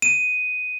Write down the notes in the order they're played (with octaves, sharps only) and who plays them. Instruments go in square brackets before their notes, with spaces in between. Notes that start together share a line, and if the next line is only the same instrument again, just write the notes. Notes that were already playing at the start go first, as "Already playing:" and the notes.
[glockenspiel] D#7